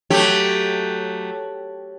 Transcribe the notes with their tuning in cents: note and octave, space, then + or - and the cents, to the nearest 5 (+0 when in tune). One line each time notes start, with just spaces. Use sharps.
F#3 +0 A3 +0 G4 +0